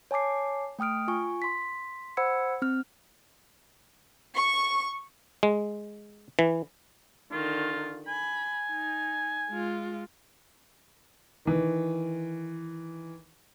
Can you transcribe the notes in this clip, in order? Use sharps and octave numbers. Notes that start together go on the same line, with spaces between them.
C#5 G#5 A5 D6 C7
A3 G5 D#6 F6 D7
F4 G#5 C#6
C6 B6
C5 F#5 B5 E6 G#6 C#7
C4 F6
C#6
G#3
E3
D3 D#3 F4
G#5 B5
D#4
G#3 F4
D#3 E3